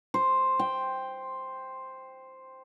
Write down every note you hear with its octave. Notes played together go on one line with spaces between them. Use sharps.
C5
G5